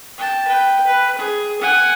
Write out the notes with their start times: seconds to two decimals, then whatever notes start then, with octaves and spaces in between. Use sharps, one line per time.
0.17 G5 A5
0.47 B4 G5
0.85 B4
1.18 G#4
1.61 F#5 G#5